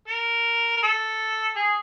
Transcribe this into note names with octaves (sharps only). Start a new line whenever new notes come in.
A#4
A#4
A4
G#4